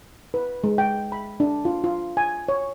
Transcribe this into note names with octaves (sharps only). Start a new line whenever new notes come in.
B4
G#3
G5
B5
D4
F4
F4
G#5
C#5